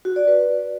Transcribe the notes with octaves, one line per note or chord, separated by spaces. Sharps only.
F#4
D5
B4